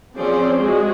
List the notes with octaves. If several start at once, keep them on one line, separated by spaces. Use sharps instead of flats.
F3 C4 C#4 G#4 C5 D5
G#3 F#4 G#4